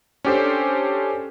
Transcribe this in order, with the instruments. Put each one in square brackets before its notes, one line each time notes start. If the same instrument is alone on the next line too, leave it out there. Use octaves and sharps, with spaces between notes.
[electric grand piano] C#4 D4 G4 A4 C5